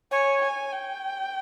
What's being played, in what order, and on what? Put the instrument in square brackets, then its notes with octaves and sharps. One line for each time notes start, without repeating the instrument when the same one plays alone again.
[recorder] C#5 [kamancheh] G#5
[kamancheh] G#5
G5